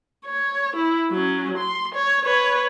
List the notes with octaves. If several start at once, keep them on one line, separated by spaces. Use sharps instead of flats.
C#5
E4
F#3 C#4
C6
C#5
B4 C#5